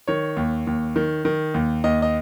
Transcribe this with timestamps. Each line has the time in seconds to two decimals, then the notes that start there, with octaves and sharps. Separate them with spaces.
0.08 D#3 C#5
0.37 D#2
0.67 D#2
0.96 D#3
1.25 D#3
1.54 D#2
1.84 D#2 D#5
2.02 D#5